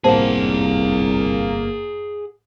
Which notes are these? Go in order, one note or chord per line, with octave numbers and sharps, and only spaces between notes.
G1 C2 A2 A#3 G#4 C5 F#5 A5